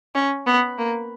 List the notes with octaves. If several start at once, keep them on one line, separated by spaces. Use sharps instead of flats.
C#4
B3
A#3